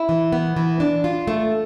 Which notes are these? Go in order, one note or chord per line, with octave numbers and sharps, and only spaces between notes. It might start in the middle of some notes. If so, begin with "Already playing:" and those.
Already playing: E4
E3
B3
E3
D4
F4
A3